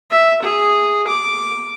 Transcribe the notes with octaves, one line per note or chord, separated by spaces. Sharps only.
E5
G#4
D6